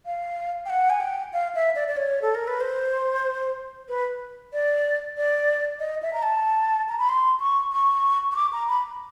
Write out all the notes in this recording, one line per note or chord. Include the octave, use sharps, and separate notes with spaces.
F5
G5
F#5
G#5
G5
F5
E5
D5
D5
C#5
A4
A#4
B4
C5
B4
D5
D5
D#5
E5
A#5
A5
A#5
B5
C6
C#6
C#6
C#6
D6
A#5
B5